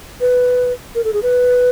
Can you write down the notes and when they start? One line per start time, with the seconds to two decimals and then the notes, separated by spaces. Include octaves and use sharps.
0.21 B4
0.95 A#4
1.04 A4
1.13 G#4
1.23 B4